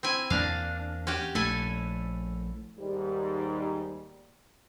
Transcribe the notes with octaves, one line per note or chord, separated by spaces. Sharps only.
C4 E4 G#5
E2 A#3 D4 F5
C#4 F#4 G4
A#1 A3 E4 A4 G#5
D#2 G#2 G3